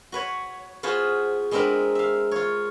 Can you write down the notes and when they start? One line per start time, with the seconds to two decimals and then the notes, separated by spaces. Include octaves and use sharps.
0.12 F#4 B4 C#5
0.83 B3 F4 F#4 G#4 C5
1.51 G#3 B3 C4 D4 A#4 B4
1.95 E5 F5
2.31 F4 C#5